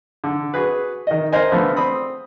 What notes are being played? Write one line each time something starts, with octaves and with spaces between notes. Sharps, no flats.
D3
F#4 G#4 B4
D#3 D#5
A#4 C5 D#5 G#5
D3 F3 A3 B3
C4 B5 D#6